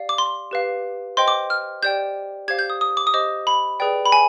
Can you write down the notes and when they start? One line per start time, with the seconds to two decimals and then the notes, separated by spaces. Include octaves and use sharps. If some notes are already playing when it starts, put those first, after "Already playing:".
Already playing: G4 D5 F5
0.09 D6
0.18 C6
0.51 G4 B4 F5
1.17 C5 D#5 G5 C6
1.28 D6
1.50 F6
1.83 G4 D5 G5 G6
2.48 G4 C5 F5 G#6
2.59 G6
2.70 D#6
2.81 D#6
2.97 D6
3.07 D#6
3.14 G4 C5 D#5 D6
3.47 B5
3.80 G#4 B4 D5 G5
4.05 B5
4.12 G#5